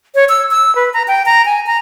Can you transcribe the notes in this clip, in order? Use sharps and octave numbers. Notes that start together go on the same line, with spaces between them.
C#5
E6
E6
B4
A#5
G5
A#5
G#5
A#5